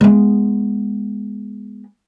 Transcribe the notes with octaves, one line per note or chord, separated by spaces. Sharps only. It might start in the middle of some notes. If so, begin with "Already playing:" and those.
G#3 B3